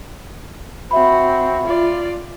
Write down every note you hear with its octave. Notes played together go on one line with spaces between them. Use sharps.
C4 F#4 E5 B5
F4 D5